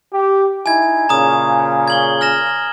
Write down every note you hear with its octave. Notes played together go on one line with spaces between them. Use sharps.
G4
D#4 E4 G#5 G#6
A#2 C#3 A#5 D#6
G#6 F#7 G7
F6 A#6 E7